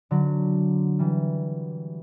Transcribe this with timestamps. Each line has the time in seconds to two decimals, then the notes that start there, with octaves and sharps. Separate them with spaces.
0.11 D3 F#3
0.99 E3 G3